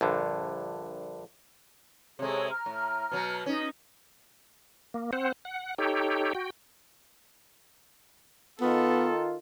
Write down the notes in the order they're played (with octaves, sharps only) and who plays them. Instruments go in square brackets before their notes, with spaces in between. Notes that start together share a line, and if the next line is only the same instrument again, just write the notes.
[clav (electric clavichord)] A#1 G2 D3
[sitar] C3 G#3 [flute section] G#4 A4 C#5
[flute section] A#5 F6
[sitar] A2
B2 F#3
[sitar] C#4 [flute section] D#4
[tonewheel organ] A#3
C4 C5 F#5
F#5
D#4 G4 A4 C#5 G5
F#4 G5
[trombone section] D#3 F4 [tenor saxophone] B3 [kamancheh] A4